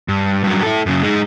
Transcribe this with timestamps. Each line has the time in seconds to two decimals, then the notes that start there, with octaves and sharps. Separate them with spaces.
0.08 G2
0.44 G2 F#3
0.63 E4 A4
0.86 F#2 C#3
1.03 G#3 D#4